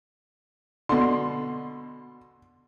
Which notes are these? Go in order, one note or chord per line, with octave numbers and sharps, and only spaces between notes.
B2 D3 C6